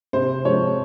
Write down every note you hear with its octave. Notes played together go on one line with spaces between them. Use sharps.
C3 C5
F3 G#3 C4 C#5